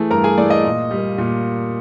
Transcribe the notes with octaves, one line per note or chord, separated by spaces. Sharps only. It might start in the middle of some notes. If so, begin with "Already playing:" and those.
Already playing: E3 A3 G#4
G2 A#4 A#5
G#4 G#5
E3 A3 D5
D#5
A#2
G3 A#3
A#2